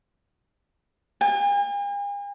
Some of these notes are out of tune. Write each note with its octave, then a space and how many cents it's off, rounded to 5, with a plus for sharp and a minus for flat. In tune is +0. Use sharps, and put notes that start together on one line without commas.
G#5 -45